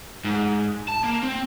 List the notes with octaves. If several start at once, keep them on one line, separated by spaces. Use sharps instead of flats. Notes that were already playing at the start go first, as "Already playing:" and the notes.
G#2
A5
A#3
C4